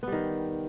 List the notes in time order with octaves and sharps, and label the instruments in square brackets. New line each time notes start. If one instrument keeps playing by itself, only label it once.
[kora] B3
G3
D#3